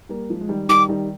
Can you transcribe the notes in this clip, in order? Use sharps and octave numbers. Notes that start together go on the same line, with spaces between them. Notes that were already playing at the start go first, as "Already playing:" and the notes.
G3 A#3
F3 G#3
G#3
D#3 G3
D#3 G3 D6
D#3 G3